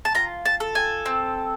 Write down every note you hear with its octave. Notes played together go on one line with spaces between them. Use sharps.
A5
F4 A#5
A5
A4
G#5
C4